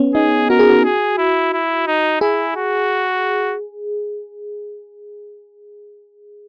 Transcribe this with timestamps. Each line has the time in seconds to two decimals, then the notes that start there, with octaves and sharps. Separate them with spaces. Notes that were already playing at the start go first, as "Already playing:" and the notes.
Already playing: B3 C#4
0.15 D#4 G#4
0.50 F#4 A#4
0.59 G#4
0.69 F#4
0.84 G#4
1.18 E4
1.53 E4
1.88 D#4
2.21 E4 G#4
2.56 F#4